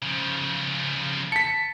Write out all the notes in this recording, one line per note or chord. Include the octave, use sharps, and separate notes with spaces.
C#3 F3
A5 B6 C#7